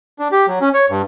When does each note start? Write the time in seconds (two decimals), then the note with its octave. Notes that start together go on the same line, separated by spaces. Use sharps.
0.19 D4
0.32 G4
0.48 F#3
0.61 C#4
0.74 C#5
0.90 G2